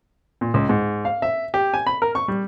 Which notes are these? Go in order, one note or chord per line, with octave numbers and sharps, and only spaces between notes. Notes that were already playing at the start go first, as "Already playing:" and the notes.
A#2
C#2
G#2
F5
E5
G4
G#5
B5
A#4
C#6
G3